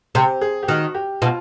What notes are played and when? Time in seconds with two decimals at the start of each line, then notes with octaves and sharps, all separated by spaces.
0.15 C3 G4
0.41 G#4
0.63 G4
0.68 D#3 F#4
0.95 G4
1.22 B2 F4